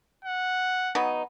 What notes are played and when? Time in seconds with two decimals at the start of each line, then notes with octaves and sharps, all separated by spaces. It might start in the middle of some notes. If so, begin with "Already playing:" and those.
0.25 F#5
0.95 F#3 B3 D#4